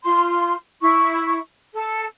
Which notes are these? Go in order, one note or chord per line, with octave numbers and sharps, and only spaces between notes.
F4 C6
E4 C#6
A4